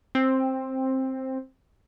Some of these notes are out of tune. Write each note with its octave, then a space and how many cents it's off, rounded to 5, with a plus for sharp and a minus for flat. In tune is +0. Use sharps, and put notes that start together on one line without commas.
C4 +10